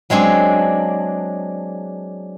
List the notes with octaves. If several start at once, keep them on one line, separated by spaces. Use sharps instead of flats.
F#3 G#3 C4 D4